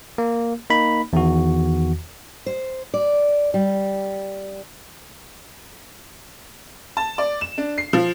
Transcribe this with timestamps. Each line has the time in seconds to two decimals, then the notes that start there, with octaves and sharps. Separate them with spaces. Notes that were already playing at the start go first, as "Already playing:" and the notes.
0.18 A#3
0.70 A#3 D#4 B5
1.13 E2 D#3 F#4
2.46 C5
2.94 D5
3.54 G3
6.97 A5
7.18 D5
7.41 E7
7.58 D4
7.78 C7
7.93 F3